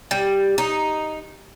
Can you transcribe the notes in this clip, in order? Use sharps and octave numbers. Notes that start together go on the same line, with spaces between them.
G3
D#4